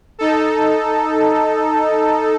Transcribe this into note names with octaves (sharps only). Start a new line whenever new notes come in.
D#4 A4